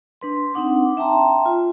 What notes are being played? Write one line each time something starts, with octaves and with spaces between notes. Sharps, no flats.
D4 B4 C6
C4 D4 D#4 F#5 D6
E5 G5 A5 A#5 C6
F4